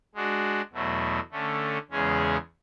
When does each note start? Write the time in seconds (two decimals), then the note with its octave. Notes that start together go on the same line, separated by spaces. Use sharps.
0.15 G#3 D4 F#4
0.73 E2 B2 F#3 A3
1.31 D3 A3 C#4
1.91 E2 C#3 G#3 C#4 G#4